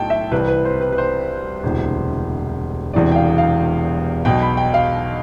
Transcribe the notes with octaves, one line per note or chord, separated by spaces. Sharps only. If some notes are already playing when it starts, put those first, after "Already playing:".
Already playing: B1 A2 G5 A5
E5
C2 C3 E3 B4
B4
C5
B4
B4
C5
E1 D2 C3 E3
E1 E2 C3 E3 D5
G5
F5
F5
B1 B2 G5
B5
G5
F5